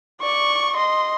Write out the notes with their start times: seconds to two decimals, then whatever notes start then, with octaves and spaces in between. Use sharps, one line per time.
0.21 D5 C#6
0.76 D#5 C6